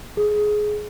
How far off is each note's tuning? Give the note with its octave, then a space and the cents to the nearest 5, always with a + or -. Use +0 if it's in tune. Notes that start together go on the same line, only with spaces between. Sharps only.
G#4 +15